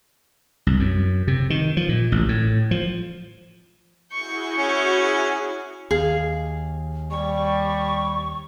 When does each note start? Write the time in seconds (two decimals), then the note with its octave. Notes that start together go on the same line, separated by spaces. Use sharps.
0.67 C2
0.80 F#2
1.28 C3
1.50 D#3
1.77 F3
1.89 A#2
2.12 A1
2.29 A2
2.71 F3
4.13 E4 F#4 G#4 C#6 G6
4.58 C#4
5.91 D#2 G#4 F5
7.11 G3 C#6